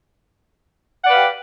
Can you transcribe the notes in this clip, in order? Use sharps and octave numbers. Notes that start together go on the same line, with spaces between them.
G4 B4 D5 F5 F#5